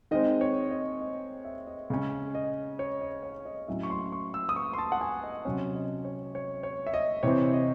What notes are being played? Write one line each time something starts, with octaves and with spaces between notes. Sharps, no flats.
D#3 G#3 C4 D#5
C#5
D#5
D#5
E5
D#5
C#3 G#3 C#4
D#5
C#5
D#5
C#5
D#5
A2 F#3 C#4 E5
C#6
C6
C#6
E6
D#6
C#6
C6
A5
F#5
G#5
D#5
C3 F#3 C#4 C#5
D#5
C#5
C#5
C#5
E5
D#5
C3 E3 C4 C#5
D#5